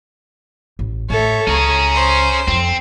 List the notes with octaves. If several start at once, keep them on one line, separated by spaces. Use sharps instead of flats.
A1
A2 A4 C#5 E5
C#2 C#4 G#4 A#5
C5
F2 C4